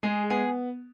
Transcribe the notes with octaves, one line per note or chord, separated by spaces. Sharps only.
G#3 G#4
B3 G#4